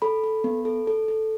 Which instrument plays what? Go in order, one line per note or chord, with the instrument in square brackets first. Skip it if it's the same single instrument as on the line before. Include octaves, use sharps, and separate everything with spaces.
[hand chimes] A4 B5
A4
B3
A4
A4
A4